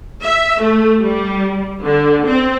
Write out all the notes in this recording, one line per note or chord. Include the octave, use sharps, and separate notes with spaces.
E5
A3
G3
D3
C4